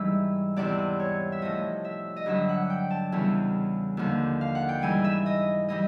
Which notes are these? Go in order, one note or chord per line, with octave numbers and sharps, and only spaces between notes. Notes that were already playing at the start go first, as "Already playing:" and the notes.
Already playing: G#2 E3 G3 E5
E2 C3 E3 D5
C#5
E5
A2 F3 D#5
E5
D#5
G2 D3 F#3 E5
F#5
G5
A5
E2 C#3 E3 G3
D#2 D3 F3
F5
F#5
G5
G#2 E3 G3 G#5
E5
D#5
E3 G3 D#5